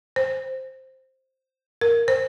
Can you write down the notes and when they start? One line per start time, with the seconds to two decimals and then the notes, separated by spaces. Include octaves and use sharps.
0.16 C5
1.81 A#4
2.08 C5